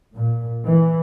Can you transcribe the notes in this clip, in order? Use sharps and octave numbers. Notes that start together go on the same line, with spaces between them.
A#2
E3